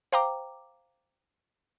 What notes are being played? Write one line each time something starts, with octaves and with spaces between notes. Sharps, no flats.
C5 F5 G5 A#5 D6